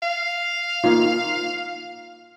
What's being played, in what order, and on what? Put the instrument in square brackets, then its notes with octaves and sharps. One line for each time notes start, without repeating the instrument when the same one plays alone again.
[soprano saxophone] F5
[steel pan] A#3 D#4 F4